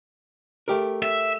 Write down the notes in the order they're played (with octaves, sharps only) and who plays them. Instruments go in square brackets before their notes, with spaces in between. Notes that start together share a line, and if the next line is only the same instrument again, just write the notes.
[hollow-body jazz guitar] A3 G4 A#4
[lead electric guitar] E5